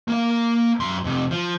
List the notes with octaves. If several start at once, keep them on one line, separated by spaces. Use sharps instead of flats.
A#3 F5
F#2 C6
F2 C3
F3